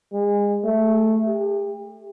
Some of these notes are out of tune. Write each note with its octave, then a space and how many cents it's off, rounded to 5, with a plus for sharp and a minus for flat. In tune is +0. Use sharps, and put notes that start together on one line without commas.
G#3 -30
A3 +0
G4 +40